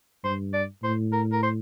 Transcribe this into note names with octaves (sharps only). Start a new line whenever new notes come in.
G2 C5
D5
A2 C5
A#4
A#4
C5